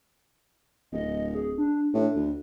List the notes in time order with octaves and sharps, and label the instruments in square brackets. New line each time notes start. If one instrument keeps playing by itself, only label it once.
[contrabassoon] D1 [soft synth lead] D#5
[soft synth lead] G#4
D4
[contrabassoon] A2 [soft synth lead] D4
[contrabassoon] D2